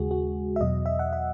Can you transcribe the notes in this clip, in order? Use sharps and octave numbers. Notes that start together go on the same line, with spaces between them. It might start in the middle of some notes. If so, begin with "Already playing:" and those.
Already playing: D#2 C#3 G#3 F#4 G#4
F#4
E5
E2 B2 F#3 D#5
E5
F#5
E5